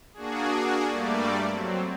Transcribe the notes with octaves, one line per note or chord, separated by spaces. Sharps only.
A#3 D4 F#4 G#4
G2 G3 A3 A#3 D5
F#3 C4